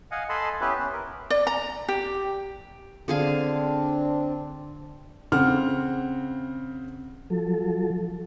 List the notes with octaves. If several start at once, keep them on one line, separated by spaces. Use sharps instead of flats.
D#5 F5 F#5 G#5
A4 D#5 G#5 A5 B5 C6
B3 C#4 E4 G4 B4
B3 C#4
A#4
D5
A#5
G4
D3 C4 D4 G#4 F5
C#3 C4 F#5 F6
F3 F#3 A4